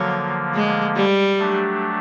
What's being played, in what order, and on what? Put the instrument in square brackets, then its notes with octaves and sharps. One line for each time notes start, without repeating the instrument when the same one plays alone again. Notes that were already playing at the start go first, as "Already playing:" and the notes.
Already playing: [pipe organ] D3 F3 A#3 [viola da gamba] F#3
[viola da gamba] G#3
G3
[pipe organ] F#3 A3 D4 G4